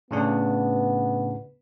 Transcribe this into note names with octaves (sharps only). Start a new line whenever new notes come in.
A2 C#3 B3 D4